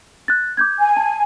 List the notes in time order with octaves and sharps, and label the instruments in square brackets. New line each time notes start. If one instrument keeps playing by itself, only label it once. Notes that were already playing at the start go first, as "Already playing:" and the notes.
[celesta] F#6 A6
D6 G6 G#6
[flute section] G#5
[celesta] A5